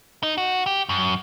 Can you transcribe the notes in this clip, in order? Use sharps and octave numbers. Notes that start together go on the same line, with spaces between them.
D#4
F#4
G4
F#2